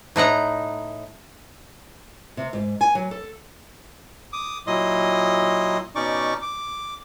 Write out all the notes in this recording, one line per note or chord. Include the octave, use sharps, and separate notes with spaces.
A2 D#4 F#5 A#5
C3
G#2
G#5
F#3
A4
D6 D#6
A#2 F#3 E4 D#5 C6 D#6
B2 C#4 D#4 D5 C#6 D6
D6